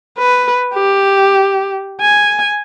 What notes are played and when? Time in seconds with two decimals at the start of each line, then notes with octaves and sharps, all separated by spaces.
0.19 B4
0.74 G4
2.01 G#5